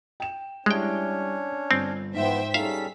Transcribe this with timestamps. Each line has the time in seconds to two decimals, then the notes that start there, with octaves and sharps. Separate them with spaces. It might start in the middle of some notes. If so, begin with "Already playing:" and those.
0.20 G5 E7
0.66 G3 G#3 C#4 D4 E4 C#5 G5
1.71 G1 C4
2.14 G#2 E3 F3 B3 C5 E5 G5
2.54 G3 C#4 D#4 G#4 A4 E5 F5 B6